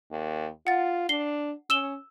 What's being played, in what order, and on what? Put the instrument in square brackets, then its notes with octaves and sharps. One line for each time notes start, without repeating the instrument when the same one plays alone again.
[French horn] D#2
[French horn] F4 [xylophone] F#5 A6
[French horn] D4 [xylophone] C7 G7
[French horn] C#4 [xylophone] E6 E7 G7